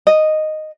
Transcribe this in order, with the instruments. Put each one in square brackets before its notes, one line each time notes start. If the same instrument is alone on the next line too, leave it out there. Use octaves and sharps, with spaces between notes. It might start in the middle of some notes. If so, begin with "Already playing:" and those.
[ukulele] D#5